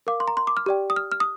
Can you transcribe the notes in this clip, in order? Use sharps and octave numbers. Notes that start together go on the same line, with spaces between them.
A#4 F5 D6
C6
A#5
C6
D6
F6
G4 D5 G5
D#6
F6
F6
D#6